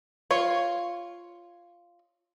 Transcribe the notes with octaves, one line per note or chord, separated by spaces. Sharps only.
F4 C#5